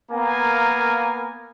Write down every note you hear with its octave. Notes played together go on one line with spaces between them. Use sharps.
A#3 B3 A#4 F5 G#5